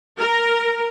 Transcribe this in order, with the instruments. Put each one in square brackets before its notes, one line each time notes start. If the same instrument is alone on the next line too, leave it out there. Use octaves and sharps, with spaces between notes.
[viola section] A#4